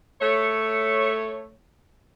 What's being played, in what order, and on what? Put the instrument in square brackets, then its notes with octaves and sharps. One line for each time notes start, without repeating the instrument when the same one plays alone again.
[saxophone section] A3 C#5